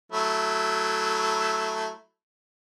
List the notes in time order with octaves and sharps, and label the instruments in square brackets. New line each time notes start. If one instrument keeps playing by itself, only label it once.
[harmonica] F#3 A3 E4